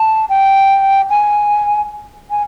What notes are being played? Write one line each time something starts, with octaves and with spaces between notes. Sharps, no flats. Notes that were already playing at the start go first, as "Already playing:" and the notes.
Already playing: A5
G5
G#5
G#5